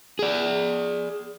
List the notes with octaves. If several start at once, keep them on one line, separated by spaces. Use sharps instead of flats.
G#4 D5